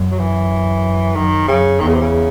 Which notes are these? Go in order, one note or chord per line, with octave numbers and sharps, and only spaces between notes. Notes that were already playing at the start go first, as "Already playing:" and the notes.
Already playing: F#2
F#3
E3
F#2 D#3
F#2 C#3
E2 D#3
C#3
C3
C#3